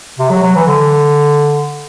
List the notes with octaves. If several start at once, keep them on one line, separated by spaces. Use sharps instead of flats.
C3
F#3
F#3
E3
D3